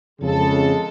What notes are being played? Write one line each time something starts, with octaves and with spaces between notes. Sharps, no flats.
F2 C#3 G#3 A4